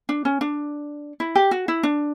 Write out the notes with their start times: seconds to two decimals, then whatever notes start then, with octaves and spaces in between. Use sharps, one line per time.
0.09 D4
0.25 C#4
0.41 D4
1.20 E4
1.35 G4
1.51 F#4
1.68 E4
1.83 D4